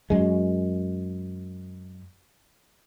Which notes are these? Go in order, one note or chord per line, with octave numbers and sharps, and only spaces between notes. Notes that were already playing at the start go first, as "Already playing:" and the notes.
F#2 G#3